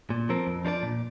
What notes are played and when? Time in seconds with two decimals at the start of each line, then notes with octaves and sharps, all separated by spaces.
0.10 A#2
0.29 F3 C4 A#4
0.47 F2
0.65 F3 D4 A#4 D5
0.83 A#2